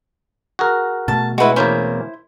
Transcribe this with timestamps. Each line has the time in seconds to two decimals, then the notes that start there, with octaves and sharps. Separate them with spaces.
0.59 F#4 G#4 A#4
1.08 B2 A3 A5
1.38 G#3 E4 F#4 B4
1.56 E2 A#3 C#4 E4 C5